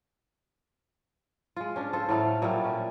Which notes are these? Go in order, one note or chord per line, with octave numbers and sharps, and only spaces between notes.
G#3 F4
C#4 D4
F4 A4 C5
A2 F#3 A3 F5
A#2 F#3 G3 A3
C#4